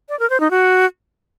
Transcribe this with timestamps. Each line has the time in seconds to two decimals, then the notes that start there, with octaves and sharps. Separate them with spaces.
0.09 D5
0.19 A#4
0.30 C5
0.40 D#4
0.51 F#4